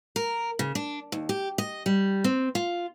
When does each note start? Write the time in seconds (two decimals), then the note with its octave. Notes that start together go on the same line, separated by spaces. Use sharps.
0.16 A#4
0.59 C#3
0.75 D4
1.12 D#2
1.29 G4
1.58 D#5
1.86 G3
2.24 C4
2.55 F4